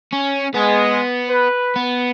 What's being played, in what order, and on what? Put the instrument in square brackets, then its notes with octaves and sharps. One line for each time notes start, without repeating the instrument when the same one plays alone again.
[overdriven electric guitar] C#4
[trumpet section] G#3 [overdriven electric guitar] B3
[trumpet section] B4
[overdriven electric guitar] B3